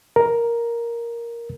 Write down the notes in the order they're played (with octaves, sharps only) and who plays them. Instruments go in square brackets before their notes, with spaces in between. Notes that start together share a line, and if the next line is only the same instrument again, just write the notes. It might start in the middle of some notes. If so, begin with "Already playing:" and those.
[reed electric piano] A#4